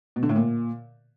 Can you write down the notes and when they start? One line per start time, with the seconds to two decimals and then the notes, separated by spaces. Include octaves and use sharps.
0.16 B2
0.23 D3
0.29 A2
0.36 A#2